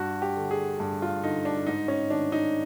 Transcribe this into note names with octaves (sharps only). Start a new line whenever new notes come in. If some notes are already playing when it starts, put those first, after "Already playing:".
Already playing: G2 F#4
G4
D3
G#4
G2
F4
D3 D#4
D4
G#2 D#4
C#4
D#3 D4
D#4